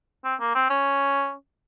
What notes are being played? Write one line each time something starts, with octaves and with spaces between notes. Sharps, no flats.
C4
A#3
C4
C#4